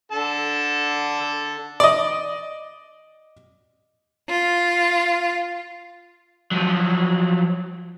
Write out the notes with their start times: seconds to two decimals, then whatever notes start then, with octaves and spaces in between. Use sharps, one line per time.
0.12 D3 A4 A5
1.80 D5 D#5
4.29 F4
6.51 F3 F#3